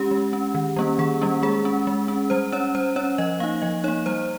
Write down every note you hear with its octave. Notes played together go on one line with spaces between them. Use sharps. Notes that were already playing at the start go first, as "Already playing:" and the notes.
Already playing: G#3 C#4 G4
G#3
C#4
D#3
G3 A#3 C#4
D#3 G#4
G3 A#3 C#4
G#3 G#4
C#4
G#3
C#4
G3 C5
C#4 C#5
G3 C5
C#4 C#5
F3 D#5
A#3 D#4 F5
F3 D#5
A#3 D#4 C#5
G3 C5